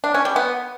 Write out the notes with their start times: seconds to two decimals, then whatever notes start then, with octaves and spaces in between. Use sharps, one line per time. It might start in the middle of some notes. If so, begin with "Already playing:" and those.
0.04 D4
0.14 C#4
0.25 G3
0.36 B3